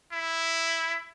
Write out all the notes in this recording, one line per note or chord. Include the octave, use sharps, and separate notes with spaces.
E4